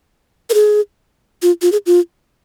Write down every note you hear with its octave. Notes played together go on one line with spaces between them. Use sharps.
A#4
G#4
F4
F4
G#4
F4